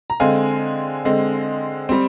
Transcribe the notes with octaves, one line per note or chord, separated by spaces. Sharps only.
A#5
D3 G#3 C4 F5 G#5
D3 G#3 C4
G3 C4